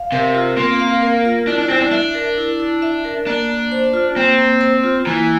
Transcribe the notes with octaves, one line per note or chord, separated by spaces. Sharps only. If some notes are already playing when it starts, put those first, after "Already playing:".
Already playing: F5
C3 A#4
F4
A#3 C4
F5
A#4
F4
D4 E4
D4
C4 E4
D4
D4 E5
A#4
E4
E4
E5
A#4
A#3 D4
A#3
C5
F4
A#3 C4
A#3
C5
F4
E3 A#3